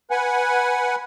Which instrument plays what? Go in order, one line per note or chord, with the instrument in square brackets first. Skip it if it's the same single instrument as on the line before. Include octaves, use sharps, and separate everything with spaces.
[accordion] B4 F#5 G#5